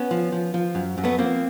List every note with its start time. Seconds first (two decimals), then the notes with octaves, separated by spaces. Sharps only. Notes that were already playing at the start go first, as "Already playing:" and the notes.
Already playing: B3 C#4
0.11 F3
0.32 F3
0.54 F3
0.75 F#2
0.98 F#2
1.04 A3 B3
1.18 F3 A#3 C4